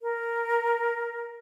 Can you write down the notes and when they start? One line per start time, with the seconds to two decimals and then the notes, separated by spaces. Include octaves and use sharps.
0.02 A#4